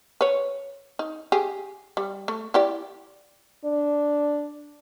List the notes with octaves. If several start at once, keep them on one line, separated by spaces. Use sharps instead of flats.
B4 C#5
D#4
G4 G#4
G3
A3
E4 G4 D5
D4